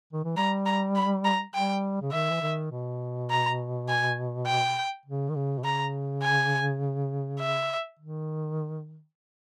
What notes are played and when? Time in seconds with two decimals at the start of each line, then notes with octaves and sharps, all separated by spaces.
0.13 D#3
0.24 E3
0.37 G3 A#5
0.66 A#5
0.95 B5
1.25 A#5
1.54 G3 G5
2.01 C#3
2.12 D#3 E5
2.30 E3
2.41 D#3
2.71 B2
3.30 A#5
3.88 G#5
4.47 G5
5.05 C#3
5.29 D#3
5.35 C#3
5.58 B2
5.64 C#3 A#5
6.23 G#5
7.40 E5
7.99 D#3